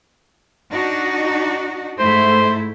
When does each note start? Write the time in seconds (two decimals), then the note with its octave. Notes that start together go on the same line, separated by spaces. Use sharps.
0.71 D4 D#4 F#4
1.99 G#2 A3 E4 C5